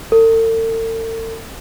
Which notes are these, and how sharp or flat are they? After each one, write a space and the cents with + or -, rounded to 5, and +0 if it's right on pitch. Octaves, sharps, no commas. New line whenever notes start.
A4 +45